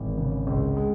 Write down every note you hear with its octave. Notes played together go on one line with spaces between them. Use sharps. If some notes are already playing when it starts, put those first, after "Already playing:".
Already playing: G#1 E3
C#3
C#2
G#3